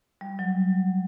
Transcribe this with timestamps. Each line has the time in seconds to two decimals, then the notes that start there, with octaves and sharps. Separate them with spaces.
0.21 G3
0.39 F#3